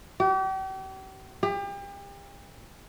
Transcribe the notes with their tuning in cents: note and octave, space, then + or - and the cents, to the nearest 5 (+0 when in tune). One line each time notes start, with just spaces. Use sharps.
G4 -40
G4 +35